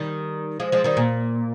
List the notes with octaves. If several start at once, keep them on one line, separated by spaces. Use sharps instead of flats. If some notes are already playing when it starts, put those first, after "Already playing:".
Already playing: D#3 G3
F3 G#3
F3 G#3
D#3 G3
A#2